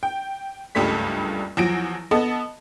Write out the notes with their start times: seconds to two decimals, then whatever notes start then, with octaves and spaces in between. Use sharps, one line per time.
0.03 G5
0.75 F#1 C#2 G2 G3 A3 B6
1.57 E2 F3 F#3 A#6 D7
2.11 B3 A4 D#5 A5